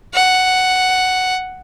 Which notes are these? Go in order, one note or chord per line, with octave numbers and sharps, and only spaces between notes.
F#5